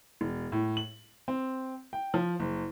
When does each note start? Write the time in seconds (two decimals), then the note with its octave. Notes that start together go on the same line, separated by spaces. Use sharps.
0.21 E1
0.52 A2
0.77 F#7
1.28 C4
1.93 G5
2.14 F3
2.40 F#1